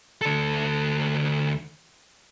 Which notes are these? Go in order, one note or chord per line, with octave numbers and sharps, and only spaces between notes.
D2 A4